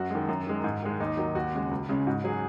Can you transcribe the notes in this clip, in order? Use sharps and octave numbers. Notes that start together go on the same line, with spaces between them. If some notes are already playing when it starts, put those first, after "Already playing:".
Already playing: F#2 F#4
D#3 G#3
F#2
D#3 G#3
G#2
D#3 G#3
D#2 D#4
D#3 F#3
D#2 F#4
C#3 G#3
C#2
C#3 G#3
G#2 F#4
F#3 G#4